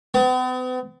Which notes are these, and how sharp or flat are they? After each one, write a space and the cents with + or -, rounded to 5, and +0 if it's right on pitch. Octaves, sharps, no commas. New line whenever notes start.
B3 +45